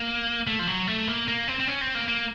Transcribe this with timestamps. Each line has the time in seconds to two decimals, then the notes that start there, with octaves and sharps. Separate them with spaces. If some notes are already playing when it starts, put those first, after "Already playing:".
Already playing: A#3
0.47 A3
0.59 F3
0.67 F#3
0.87 A3
1.08 A#3
1.28 A#3
1.48 C4
1.60 C4
1.68 C#4
1.81 C4
1.95 A#3
2.08 A#3